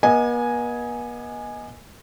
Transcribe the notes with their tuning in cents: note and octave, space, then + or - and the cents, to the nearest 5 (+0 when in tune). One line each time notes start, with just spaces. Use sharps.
B3 -45 D#5 +10 G#5 +0